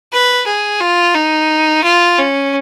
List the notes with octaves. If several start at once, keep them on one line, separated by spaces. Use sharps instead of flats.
B4
G#4
F4
D#4
F4
C#4